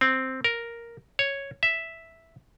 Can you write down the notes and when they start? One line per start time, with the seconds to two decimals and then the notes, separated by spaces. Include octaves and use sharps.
0.01 C4
0.44 A#4
1.19 C#5
1.63 E5